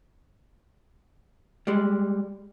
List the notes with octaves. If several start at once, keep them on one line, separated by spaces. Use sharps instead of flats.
G3 G#3